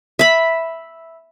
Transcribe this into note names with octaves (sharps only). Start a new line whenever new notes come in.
E5 B5